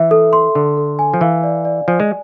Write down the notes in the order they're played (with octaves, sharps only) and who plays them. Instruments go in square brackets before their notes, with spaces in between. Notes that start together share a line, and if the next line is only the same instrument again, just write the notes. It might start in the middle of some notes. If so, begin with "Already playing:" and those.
Already playing: [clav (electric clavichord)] E3 [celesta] E5
[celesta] A4
C6
[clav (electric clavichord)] D3 [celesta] A4
[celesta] A4
G#5
[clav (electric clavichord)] F3
[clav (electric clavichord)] E3 [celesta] F5
[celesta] D5
D5
[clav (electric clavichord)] F3 [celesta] G#5
[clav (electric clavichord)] G#3